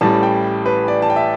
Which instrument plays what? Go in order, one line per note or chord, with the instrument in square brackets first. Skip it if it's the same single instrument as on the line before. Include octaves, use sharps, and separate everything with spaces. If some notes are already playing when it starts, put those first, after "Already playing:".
[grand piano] A1 A2 G3 A5
G5
B4
D5
A5
G5
E5